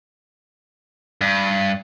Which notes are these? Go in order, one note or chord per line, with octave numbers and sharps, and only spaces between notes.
G2